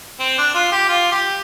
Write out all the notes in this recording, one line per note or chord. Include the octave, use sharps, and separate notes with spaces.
C4
D4
F4
G4
F4
G4